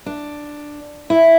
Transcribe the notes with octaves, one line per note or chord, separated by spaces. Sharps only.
D4
E4